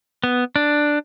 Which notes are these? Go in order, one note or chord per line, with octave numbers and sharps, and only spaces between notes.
B3
D4